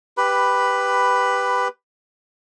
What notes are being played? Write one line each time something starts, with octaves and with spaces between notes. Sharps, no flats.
G4 B4 B5